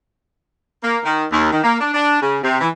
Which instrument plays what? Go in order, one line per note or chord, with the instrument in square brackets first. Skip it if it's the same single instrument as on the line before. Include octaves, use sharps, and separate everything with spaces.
[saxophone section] A#3
D#3
D#2
D#3
A#3
D4
D4
C#3
C3
E3